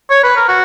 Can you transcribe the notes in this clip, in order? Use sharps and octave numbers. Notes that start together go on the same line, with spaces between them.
C#5
B4
A#4
F#4